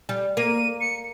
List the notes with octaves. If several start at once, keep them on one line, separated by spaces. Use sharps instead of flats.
G3
A#3 D#7
C#7